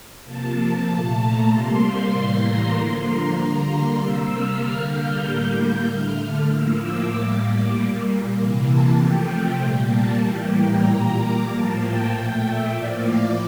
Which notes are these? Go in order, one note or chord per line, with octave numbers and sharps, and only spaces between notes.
C3 F3 A#3 A5
A#2 A3
A#5
C3 G3 A#3 C6
A2 E3 G3 A#3
A#5
D3 F3 A#3 C6
A#5
D3 G3 A#3 A#5
C6
C3 G3 A#3 E6
F6
D3 G3 A#3
G6
A2 G3 A#3
D3 A3 F6
A2 F3 A#3 E6
D6
A2 G3 A#3
A#2 G3 A#3
C3 E3 A#3
A5
C3 F3 A3 G5
A#2 G3 A#3
A5
A2 E3 G3 A#3 G5
A#5
A#2 G3 A#3
D6
A2 F3 A#3 A5
G5
A#2 A3 G5
E5
A2 F3 A#3 D5